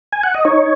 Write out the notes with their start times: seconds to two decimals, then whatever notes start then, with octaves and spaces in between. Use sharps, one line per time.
0.13 G#5
0.23 F#5
0.34 D#5
0.45 D#4 C#5